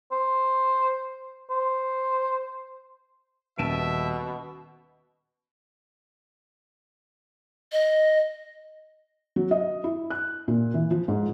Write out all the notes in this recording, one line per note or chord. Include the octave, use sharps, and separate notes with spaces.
C5
C5
D#1 B2 D#3 C#4 E5 A5 D7 E7
D#5
F#3
D#5
E4
F#6
A#2
E3
F3
G#2